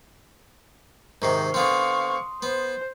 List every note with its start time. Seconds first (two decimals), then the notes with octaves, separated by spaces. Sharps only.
1.22 G#2 C3 D#3 A#4 C#6 C7
1.54 D3 B3 C4 F5 C6 C#6 D#6
2.42 B3 C5